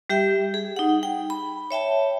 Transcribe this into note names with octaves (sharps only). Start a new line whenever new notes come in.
G3 G4 E5 G5
G#4
D#4 F#5
G5
B5
C#5 E5 G5 A5